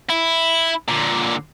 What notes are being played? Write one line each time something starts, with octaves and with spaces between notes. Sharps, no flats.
E4
A#2 D3